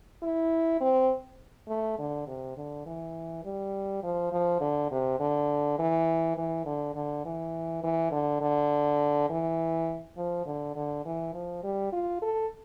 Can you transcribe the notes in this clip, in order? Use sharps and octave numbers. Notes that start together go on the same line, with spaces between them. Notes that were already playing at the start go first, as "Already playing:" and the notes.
E4
C4
A3
D3
C3
D3
E3
G3
F3
F3
D3
C3
D3
E3
E3
D3
D3
E3
E3
D3
D3
E3
F3
D3
D3
E3
F3
G3
F4
A4